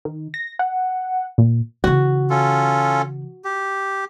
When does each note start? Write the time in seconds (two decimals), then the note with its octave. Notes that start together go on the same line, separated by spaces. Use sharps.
0.05 D#3
0.34 A#6
0.59 F#5
1.38 A#2
1.84 C#3 E3 F#4
2.30 C#4 F4 A4
3.45 G4